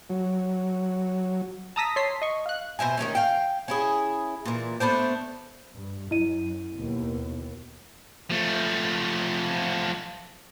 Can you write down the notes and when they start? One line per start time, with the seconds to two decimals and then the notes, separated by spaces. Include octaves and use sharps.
0.10 F#3
1.76 A5 A#5 D#6 E6 A#6 B6
1.96 C#5 A5 C6 B6 C7
2.22 D#5 C#6
2.46 F5 F#6
2.79 B2 C5 E5 G#5
2.97 D#3 G#3 A3 C#4
3.15 F5 G5
3.68 C#4 E4 G#4
4.45 A#2 E3
4.80 A3 B3 D4 C5
5.74 G2
6.11 F#2 E4 D#5 D#7
6.77 D#2 B2
8.30 F3 A3